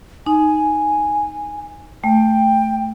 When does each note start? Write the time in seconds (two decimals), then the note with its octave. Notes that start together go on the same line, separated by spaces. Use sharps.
0.26 D#4 G#5
2.04 A3 G5